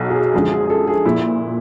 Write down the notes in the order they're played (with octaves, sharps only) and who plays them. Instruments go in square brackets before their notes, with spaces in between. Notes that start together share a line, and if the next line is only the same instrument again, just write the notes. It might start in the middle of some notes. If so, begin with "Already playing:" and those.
Already playing: [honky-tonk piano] B1 B2 F#3 [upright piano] F#4
[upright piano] G#4
[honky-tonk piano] F#2 D3 F3 G#3 [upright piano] G#4
[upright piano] G#4
G#4
A4
G#4
[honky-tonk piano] A#2 F3 [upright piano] E4